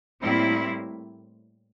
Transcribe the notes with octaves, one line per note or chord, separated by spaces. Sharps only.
A2 G3 A#3 C4 E4